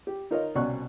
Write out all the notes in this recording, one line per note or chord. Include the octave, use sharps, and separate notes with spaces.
G4
D#4 F4 A#4 C#5 D#5
C2 B2 C#4 D5 C#6 F#6